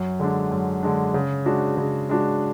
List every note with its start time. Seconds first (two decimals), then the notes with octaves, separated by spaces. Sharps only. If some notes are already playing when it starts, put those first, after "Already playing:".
Already playing: F#2
0.19 D3 G#3 D4
0.51 F#2
0.83 D3 G#3 D4
1.14 C#3
1.46 G#3 D4 F#4
1.77 C#3
2.09 G#3 D4 F#4